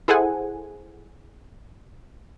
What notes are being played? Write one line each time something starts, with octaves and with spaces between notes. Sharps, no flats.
E4 G#4 A4 C5 F#5 G#5